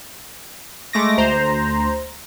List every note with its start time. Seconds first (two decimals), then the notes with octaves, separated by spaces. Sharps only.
0.93 G#3 A3 D6 A#6
1.17 D2 C5 A#5